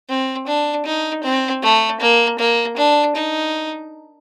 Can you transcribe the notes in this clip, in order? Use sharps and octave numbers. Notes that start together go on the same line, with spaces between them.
C4
D4
D#4
C4
A3
A#3
A#3
D4
D#4